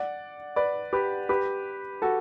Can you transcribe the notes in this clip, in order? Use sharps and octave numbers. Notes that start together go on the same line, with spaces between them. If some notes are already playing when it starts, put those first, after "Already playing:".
Already playing: D5 F#5
B4 D5
G4 B4
G4 B4
F#4 A4